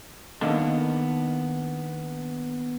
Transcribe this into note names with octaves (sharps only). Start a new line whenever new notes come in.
D#3 A#3 B3 D4 A4